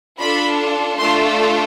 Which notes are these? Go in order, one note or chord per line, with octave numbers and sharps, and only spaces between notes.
D4 F4 A4 B5
A3 D4 F4 A4 C6